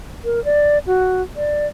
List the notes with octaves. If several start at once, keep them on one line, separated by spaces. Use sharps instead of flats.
A#4
D5
F#4
D5